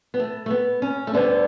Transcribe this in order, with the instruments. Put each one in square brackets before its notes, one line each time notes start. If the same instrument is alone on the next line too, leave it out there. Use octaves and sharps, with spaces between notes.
[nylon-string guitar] B3
A3
A3
B3
C#4
A3
D2 D3 G3 B3